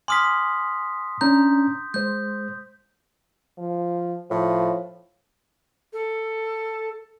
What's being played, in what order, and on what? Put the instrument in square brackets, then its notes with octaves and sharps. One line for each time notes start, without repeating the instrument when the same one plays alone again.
[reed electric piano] G#5 D6 F6 [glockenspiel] C6 D#6 B6
[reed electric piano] C#4 D4 A#5 [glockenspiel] G6
[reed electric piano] G#3 C5 [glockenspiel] G6
[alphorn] F3
[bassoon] A2 [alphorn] F3
[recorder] A4